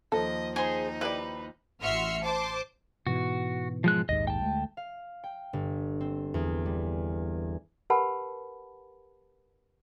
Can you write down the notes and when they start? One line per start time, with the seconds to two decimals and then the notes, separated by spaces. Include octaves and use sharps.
0.12 D#2 F3 A4 D#5
0.56 D#4 G#4 C5
1.01 E4 G4 B4 D5
1.80 A1 F#4 E5 C6 F6 C#7
2.22 C5 A5 C6 D6
3.07 G#2 B2 E3 F#4
3.84 F3 G#3 F#6
4.09 A#1 D#2 G#2 D#5
4.27 G5 A5
4.42 D2 G#3 A3
4.77 F5
5.24 G5
5.53 G1
6.00 C4
6.34 E2
6.66 G3
7.90 G4 A#4 B4 F#5 A5 B5